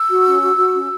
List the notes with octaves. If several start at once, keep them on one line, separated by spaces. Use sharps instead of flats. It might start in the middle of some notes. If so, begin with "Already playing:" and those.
Already playing: E6
F#4
C#4
F#4
F#4
C#4